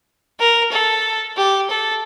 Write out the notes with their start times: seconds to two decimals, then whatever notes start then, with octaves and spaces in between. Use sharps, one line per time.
0.40 A#4
0.72 A4
1.37 G4
1.70 A4